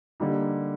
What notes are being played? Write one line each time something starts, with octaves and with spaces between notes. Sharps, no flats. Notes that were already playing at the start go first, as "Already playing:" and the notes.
D3 G3 A#3 D#4